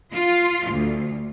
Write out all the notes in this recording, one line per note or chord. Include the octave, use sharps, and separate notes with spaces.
F4
D2